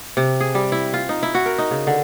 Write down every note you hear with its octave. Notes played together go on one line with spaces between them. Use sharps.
C3
G#4
G3
E4
F4
D#4
E4
F#4
A#4
D#4
C#3
D3